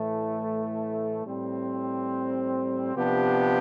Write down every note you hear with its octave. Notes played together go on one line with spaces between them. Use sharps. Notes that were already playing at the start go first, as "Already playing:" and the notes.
Already playing: A2 E3 A3
A2 G3 C4
C3 F3 B3 D4 G4